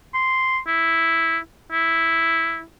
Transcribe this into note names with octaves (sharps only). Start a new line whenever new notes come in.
C6
E4
E4